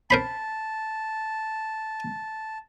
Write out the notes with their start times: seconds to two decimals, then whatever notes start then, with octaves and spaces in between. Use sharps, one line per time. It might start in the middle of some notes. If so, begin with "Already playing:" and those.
0.10 A#4 C5 A5 B5